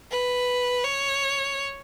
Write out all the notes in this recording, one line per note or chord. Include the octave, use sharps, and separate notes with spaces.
B4
C#5